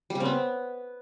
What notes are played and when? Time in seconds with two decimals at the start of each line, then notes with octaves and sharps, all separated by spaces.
0.10 G3
0.15 C#3
0.20 C4
0.25 B3